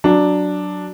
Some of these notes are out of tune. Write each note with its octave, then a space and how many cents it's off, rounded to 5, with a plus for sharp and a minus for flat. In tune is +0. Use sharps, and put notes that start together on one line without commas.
F#3 +0 D4 +0